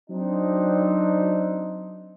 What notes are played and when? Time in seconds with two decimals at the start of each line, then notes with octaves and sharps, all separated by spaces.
0.10 F#3 C4 D4 D#4